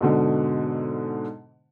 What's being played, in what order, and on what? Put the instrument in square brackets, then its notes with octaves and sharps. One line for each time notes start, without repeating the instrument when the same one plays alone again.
[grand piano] G#2 B2 D3